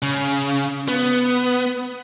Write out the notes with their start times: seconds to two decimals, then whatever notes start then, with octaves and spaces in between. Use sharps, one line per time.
0.02 C#3
0.88 B3